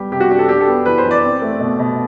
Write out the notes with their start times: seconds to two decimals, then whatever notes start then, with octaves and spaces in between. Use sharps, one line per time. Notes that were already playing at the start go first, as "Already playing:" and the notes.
Already playing: G3 B3 G4
0.12 C3 G4
0.20 F#4
0.30 D4 G4
0.39 A4
0.49 D4 G4
0.61 A4
0.68 B3
0.86 E3 B4
0.98 C5
1.04 E3
1.11 D5
1.24 C4
1.42 A3
1.60 B2
1.79 B2